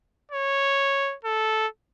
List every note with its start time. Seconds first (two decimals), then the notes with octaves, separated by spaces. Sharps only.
0.32 C#5
1.25 A4